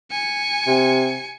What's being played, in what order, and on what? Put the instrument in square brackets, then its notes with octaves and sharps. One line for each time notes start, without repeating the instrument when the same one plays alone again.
[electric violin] G#5 C#7
[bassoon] C3